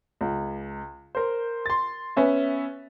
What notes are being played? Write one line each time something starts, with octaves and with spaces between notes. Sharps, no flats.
C#2
A#4 C5
C6 A6
B3 C#4 E5